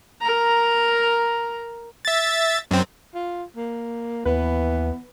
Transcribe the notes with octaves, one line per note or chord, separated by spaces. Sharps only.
A#4 A#5
E5 A6
F#2 C4
F4
A#3
D#2 E3 B3 B4